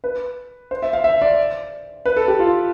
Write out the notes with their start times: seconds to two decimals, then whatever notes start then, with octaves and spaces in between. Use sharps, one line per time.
0.04 B4
0.71 C5
0.82 E5
0.93 F5
1.04 E5
1.22 D5
2.05 B4
2.17 A4
2.28 G4
2.39 F4